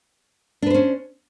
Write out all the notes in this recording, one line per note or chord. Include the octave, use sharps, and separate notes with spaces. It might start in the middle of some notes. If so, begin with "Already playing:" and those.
C#4 D4 B4 C5